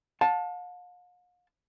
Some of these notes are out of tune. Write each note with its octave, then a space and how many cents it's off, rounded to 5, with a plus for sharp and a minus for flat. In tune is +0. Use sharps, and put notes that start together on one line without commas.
F5 +45 A5 +0